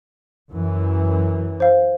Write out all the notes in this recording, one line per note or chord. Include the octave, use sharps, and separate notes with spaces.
F#2 E3
C5 F5